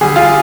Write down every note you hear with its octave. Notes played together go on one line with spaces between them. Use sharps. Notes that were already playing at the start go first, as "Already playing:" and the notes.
D3 G3 G#4
F4